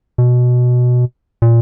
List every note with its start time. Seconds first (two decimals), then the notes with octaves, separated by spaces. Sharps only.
0.18 B2
1.42 A#2